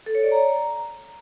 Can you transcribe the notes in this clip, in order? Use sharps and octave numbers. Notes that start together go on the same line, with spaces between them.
A4
C#5
D5
A#5